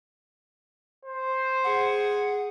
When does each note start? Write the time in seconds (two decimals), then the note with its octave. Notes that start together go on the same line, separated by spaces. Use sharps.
1.06 C5
1.64 G#4 F#5